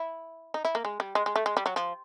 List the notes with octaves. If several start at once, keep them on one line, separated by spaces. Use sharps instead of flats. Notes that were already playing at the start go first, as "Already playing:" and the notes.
Already playing: E4
D#4
E4
A#3
G#3
G3
G#3
G#3
A3
G#3
G3
F#3
F3